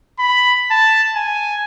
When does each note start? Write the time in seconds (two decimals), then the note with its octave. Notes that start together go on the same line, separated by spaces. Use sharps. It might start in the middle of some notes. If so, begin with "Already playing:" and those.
0.19 B5
0.71 A5
1.15 G#5